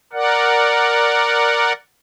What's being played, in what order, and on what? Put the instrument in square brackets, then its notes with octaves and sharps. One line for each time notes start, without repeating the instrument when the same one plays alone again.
[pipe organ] A#4 D5 F#5